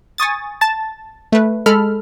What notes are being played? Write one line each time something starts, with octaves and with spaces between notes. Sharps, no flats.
G#5 C#6 D#6 A6
A5 A6
A3 B4
G#3 A4 B5 F6